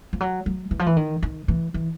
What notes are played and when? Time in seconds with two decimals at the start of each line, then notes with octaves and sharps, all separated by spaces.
0.13 F3
0.20 F#3
0.46 F#3
0.71 E3
0.79 F3
0.86 E3
0.97 D#3
1.23 D#3
1.48 E3
1.74 E3